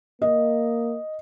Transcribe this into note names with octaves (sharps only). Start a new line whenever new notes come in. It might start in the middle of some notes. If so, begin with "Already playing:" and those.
A#3 D#5